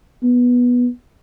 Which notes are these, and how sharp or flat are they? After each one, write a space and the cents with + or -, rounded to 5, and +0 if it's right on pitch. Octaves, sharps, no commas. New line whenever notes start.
B3 -10